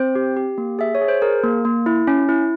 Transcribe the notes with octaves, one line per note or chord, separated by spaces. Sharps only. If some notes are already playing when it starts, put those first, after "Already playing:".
Already playing: C4 C5
G4
G4
A#3
G#4 E5
C#5
G#4
C5
G#4 A#4
A#3
A#3
E4
C#4
E4